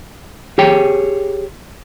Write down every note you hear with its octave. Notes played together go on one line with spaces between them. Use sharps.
G4 G#4 C#5 G5